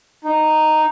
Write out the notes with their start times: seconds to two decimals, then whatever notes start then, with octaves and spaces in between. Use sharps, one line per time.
0.25 D#4